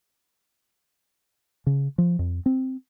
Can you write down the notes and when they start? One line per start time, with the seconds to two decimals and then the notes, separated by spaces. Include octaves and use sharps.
1.67 C#3
1.98 F3
2.19 F2
2.46 C4